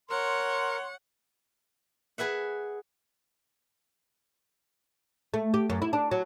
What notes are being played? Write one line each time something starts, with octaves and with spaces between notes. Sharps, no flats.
A#4 C#5 F#5 C6
G#4 B4 E5 F#5
A3
G4
F#2
E4
D4
F#3